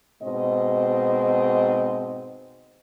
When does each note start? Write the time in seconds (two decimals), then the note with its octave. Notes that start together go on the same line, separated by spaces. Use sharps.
0.21 G#2 B2 C4 D#5